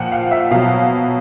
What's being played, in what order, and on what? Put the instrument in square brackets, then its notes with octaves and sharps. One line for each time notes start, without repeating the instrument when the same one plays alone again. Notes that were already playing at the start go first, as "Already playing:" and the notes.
Already playing: [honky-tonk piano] A#2 F3 F#5 G5
F5
E5
B2 F#3 F5